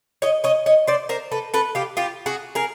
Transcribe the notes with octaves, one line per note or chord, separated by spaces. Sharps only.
C#5 D#5
C#5 D#5
C#5 D#5
C5 D5
A#4 C5
A4 B4
A4 B4
F4 G4
F4 G4
F#4 G#4
G#4 A#4